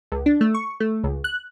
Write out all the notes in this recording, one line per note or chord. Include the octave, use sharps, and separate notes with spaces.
C#2
D4
A3
C#6
A3
C#2
F#6